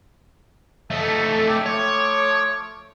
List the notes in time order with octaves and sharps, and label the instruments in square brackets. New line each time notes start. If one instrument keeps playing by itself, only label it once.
[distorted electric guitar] A3 D#4 [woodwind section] A4 E5
[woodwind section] C#5 G5 D6
[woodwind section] F3 A3 D6 [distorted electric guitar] C#5